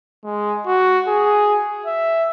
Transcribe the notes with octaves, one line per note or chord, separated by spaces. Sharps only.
G#3
F#4
G#4
E5